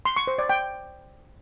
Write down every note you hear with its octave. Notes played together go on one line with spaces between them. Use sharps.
C6
C#6
C5
D5
G5